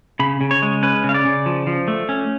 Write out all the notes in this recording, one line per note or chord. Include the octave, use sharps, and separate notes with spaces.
C#3 B5
C#3
C#5
G#3
C#4 B4
C#3
F5
D5
C#3
F3
F3
A3
C#4